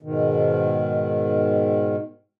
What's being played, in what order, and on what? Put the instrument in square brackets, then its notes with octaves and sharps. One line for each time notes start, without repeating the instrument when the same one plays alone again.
[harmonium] G#2 B2 D#3